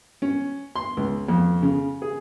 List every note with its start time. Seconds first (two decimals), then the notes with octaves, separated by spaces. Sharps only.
0.22 C#4
0.76 C6
0.97 C#2
1.29 F2
1.62 C#3
2.02 G#4